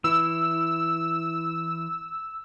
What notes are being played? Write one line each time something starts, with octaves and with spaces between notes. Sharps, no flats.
E3 E4 E6